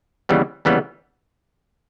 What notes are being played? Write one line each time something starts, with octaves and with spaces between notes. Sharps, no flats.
D#2 C#3 E3 G3 B3
D#2 C#3 E3 G3 B3